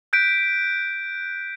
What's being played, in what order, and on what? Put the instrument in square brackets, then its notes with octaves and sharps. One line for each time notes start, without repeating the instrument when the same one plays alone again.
[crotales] F#6 G6 B6 D7